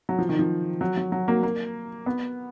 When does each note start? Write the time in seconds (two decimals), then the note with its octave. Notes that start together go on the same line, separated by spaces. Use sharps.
0.09 F#3
0.19 F3
0.29 D#3
0.39 F3
0.81 F#3
0.97 F#3
1.12 F#3
1.28 A#3
1.43 A#3
2.06 B3